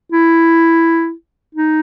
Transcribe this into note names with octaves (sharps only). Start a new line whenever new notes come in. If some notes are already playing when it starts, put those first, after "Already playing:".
E4
D#4